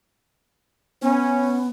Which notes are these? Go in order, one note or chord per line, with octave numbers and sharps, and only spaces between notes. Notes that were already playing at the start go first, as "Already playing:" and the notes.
B3 C#4